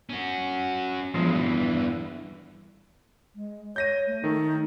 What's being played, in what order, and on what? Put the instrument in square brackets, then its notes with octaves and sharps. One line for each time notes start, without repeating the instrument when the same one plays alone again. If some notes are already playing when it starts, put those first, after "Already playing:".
[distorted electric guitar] C#4 F#4
[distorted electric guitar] E2 G2 [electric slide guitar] F3 F#3 G#3
[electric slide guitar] E3
[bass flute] G#3
[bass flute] C#5 [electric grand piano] G6 A#6 D#7
[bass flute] A3
[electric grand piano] D#3 A3 [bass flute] D#4